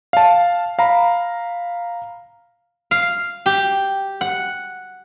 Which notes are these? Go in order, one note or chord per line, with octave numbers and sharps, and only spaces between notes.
F5 A5
F5 A#5 B5
F5
G4
F#5